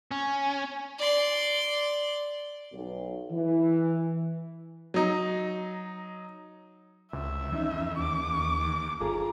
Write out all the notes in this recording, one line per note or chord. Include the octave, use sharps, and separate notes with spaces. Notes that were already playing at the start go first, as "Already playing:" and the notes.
C#4
D5 C6
B1
E3
F#3 D#4
C#2 E5
F2 E3 C#4 D#4
D#2 D6
G1 F4 G#4 A4 A#5